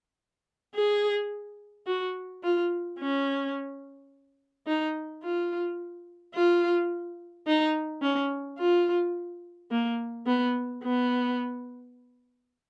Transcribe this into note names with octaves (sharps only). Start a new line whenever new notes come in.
G#4
F#4
F4
C#4
D#4
F4
F4
D#4
C#4
F4
A#3
B3
B3